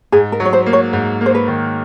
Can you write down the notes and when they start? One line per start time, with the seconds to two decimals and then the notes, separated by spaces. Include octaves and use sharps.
0.12 G#2 G#4
0.32 A#4
0.40 F#3
0.45 C#5
0.53 C5
0.66 A#3
0.73 C#5
0.93 G#2
1.21 A#3
1.26 C5
1.35 B4
1.48 D#3